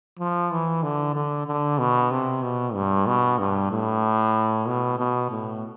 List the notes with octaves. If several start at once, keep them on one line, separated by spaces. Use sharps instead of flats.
F3
E3
D3
D3
D3
B2
C3
B2
G2
B2
G2
A2
B2
B2
A2